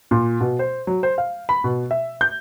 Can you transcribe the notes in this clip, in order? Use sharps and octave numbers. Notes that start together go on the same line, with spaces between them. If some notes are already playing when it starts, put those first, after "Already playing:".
A#2
B2
C5
F#3
C5
F5
B5
B2
E5
G6